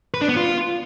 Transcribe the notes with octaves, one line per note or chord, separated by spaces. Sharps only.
B4
D4
B3
F4